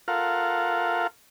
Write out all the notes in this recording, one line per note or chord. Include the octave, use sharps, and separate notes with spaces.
F4 A4 A#4 F5 F#5